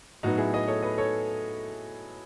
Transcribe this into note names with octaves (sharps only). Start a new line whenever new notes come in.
A2 F#3 B3 D#4 F#4
E4 G#4
B4 D#5
A4 C#5
B4 D#5
A4 C#5